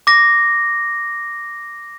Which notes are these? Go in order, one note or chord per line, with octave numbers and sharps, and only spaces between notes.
D6 A#6